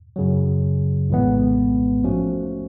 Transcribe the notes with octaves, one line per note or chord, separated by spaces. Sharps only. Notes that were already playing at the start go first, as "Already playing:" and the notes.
F#2 C#3 F#3
A#1 A2 E3 G#3 B3
G#2 F3 A3 C#4 F#4